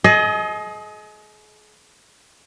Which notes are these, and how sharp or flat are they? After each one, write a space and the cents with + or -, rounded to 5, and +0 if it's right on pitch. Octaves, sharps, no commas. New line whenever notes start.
G#4 +40 D#5 +15